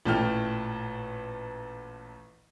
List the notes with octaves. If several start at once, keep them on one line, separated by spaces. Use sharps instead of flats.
A1 A#2 A3 E4 G5 F6